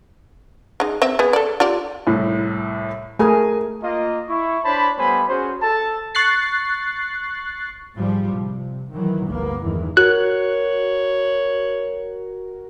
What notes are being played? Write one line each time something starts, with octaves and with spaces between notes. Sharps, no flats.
G#3 D#4
C4 E5
B3 G#4
A4 D5
F4 G4 D5
C2 A2
A3 G#4 A#4 G#5
A#3 F4 D#5
E4 C#6
D4 C5 C#5 A5 B5
G3 A3 B3 C5 G#5 B5
C#4 F#4 G#4 C5
A4 A5
C#6 F#6 A6 C7
G#2 F3 G3
C3
D#3 E3 F#3
G1 D2 A#3 B3
E2 G2 D#3 E3 G#3
F#4 A#4 C#5 F#6